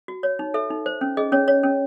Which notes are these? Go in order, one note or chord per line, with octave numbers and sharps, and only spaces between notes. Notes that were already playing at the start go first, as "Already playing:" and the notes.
F#4
C#5
D#4
A4 E5
D#4
C5
C#4
G#4 D#5
C#4 C#5
C#5
C#4